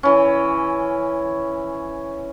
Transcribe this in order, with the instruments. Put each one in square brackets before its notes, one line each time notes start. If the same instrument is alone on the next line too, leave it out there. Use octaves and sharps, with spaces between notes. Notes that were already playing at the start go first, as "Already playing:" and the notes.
[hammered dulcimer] E3 C#4